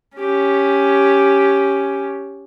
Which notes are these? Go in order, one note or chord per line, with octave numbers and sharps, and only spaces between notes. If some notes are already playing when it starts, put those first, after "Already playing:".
C#4 G4